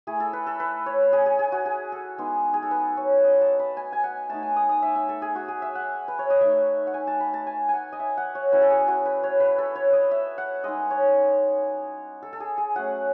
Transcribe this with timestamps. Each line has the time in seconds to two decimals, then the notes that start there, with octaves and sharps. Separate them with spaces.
0.07 A3 E4 G#4
0.20 A4
0.33 B4
0.46 A4
0.60 B4
0.86 C#5
1.13 G#4
1.26 G#4
1.39 G#4
1.52 F#4
1.65 G#4
1.92 A4
2.18 G#3 B3 D#4
2.53 G#4
2.63 A4
2.71 B4
2.97 C#5
3.24 D#5
3.41 A5
3.59 B5
3.77 G#5
3.93 G#5
4.04 F#5
4.30 A3 D#4 A5
4.43 G#5
4.56 D#6
4.69 D#6
4.82 E5
4.96 E5
5.09 A4
5.22 G#4
5.35 F#4
5.48 G#4
5.62 E5
5.75 F#5
6.08 B4
6.19 C#5
6.30 D#5
6.41 A3 D#4 E5
6.87 F#5
6.94 G#5
7.07 A5
7.20 B5
7.34 A5
7.47 G#5
7.69 F#5 G#5
7.93 D#5
8.00 E5
8.17 F#5
8.35 C#5
8.52 F#3 C#4 E4 B4
8.62 A4
8.70 G#4
8.88 F#4
9.05 B4
9.23 C#5
9.40 B4
9.58 A4
9.76 C#5
9.93 D#5
10.11 E5
10.38 F#5
10.64 G#3 D#4 D#5
10.90 C#5
12.23 A4
12.33 A4
12.40 G#4
12.58 G#4
12.76 F#3 A3 C#4 F#5